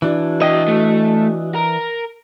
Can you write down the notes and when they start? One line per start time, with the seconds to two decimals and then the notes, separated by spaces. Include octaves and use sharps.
0.02 E3 D4 F#4
0.42 E4 D#5 G5
0.68 A3
1.56 A#4